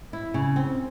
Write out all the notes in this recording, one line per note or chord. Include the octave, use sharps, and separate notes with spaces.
E4
C#3
C4